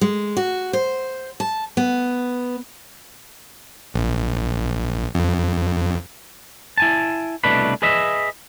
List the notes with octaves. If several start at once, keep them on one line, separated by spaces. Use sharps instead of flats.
G#3
F#4
C5
A5
B3
A#1
F2
E4 G#5 A5
C2 B2 A3 D4 B4 B5
G#4 B4 D#5 E5